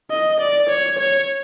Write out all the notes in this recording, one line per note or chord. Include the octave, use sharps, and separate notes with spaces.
D#5
D5
C#5
C#5